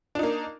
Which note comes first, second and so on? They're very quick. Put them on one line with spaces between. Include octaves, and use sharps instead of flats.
D4 D#4 A#3